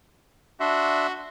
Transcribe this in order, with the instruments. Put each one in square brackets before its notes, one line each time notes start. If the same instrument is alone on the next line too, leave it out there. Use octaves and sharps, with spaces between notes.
[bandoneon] D4 E5 C6 [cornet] F#4